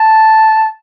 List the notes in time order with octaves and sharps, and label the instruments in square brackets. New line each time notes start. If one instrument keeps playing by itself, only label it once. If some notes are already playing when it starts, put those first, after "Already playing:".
Already playing: [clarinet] A5